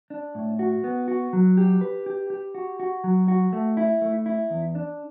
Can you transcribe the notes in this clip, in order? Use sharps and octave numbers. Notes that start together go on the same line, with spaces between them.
D4
A2
F#4
B3
F#4
F#3
G4
B4
G4
G4
F#4
F#4
F#3
F#4
A3
E4
A3
E4
E2
D4